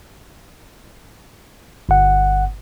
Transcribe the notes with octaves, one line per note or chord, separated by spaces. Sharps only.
G1 F#5